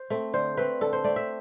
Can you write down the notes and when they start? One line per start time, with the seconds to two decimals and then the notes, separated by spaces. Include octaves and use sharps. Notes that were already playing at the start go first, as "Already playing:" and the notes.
Already playing: C5
0.10 A3 C4
0.33 D3 C5
0.57 A3 C4 B4
0.81 D3 A4
0.93 C5
1.04 A3 C4 D5
1.16 E5